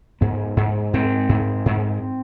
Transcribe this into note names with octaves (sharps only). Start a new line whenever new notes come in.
G#2 B3
G#2
G#2 C4
G#2
G#2